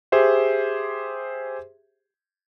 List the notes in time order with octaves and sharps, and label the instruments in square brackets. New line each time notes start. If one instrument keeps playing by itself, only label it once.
[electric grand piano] G4 G#4 C5 E5